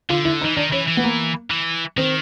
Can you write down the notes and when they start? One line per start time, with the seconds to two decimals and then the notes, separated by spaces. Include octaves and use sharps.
0.10 D3 F4
0.25 E4
0.41 D#4
0.45 E3
0.57 D#3 D4
0.72 E3 C#4
0.87 E3
0.97 B3
1.04 A#3
1.51 E3
1.97 D#3 C4